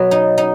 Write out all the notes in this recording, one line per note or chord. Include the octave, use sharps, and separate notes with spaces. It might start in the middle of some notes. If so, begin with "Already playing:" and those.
Already playing: B2 F#3 B3
D#4
D#4